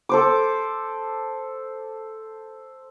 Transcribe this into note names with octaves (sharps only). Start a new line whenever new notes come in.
A4 C5 D6